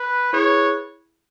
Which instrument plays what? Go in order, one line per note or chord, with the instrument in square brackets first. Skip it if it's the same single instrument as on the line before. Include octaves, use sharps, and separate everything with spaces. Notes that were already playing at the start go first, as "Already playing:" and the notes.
Already playing: [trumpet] B4
[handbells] E4 G#4 B4 [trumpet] C#5